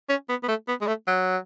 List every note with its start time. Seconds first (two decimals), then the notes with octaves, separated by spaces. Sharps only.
0.09 C#4
0.29 B3
0.43 B3
0.48 A3
0.68 B3
0.81 G#3
0.87 A3
1.07 F#3